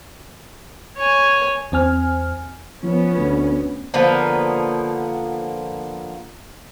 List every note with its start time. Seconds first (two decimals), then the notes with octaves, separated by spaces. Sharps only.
0.97 C#5 G#5
1.72 E2 C4 G#5 F6
2.83 F3 B3 C#4
3.17 D2
3.94 D3 F3 A#3 B3